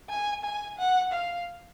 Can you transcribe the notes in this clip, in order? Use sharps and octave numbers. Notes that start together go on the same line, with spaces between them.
G#5
G#5
F#5
F5